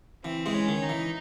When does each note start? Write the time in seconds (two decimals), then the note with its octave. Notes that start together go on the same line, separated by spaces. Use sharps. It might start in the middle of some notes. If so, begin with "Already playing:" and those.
0.24 E3 C4
0.46 E3 G#3
0.53 C#4
0.69 D#3
0.82 D#4
0.89 E3